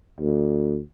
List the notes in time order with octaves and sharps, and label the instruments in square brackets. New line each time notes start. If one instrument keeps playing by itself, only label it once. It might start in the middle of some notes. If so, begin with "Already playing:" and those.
[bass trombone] D2